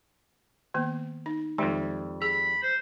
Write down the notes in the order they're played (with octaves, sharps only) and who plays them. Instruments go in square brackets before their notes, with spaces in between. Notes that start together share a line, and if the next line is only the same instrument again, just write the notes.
[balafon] D#3 A#3 B3
D#4
[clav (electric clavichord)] F2 G3 [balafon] D#3 G#3 D#4
[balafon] G#4 [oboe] B5
[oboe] C5